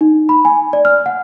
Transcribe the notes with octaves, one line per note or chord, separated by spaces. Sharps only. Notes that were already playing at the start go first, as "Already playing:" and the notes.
D#4
B5
G#5
D5
F6
F#5